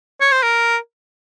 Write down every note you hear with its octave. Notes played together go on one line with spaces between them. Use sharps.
C#5
C5
A#4